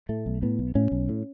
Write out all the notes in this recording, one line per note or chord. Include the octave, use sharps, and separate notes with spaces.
A2 A3
B1
A2 B3
B1
A2 C#4
B1
A2